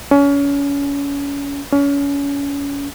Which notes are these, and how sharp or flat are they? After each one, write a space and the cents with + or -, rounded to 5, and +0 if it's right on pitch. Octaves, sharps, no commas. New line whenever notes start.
C#4 +30
C#4 +30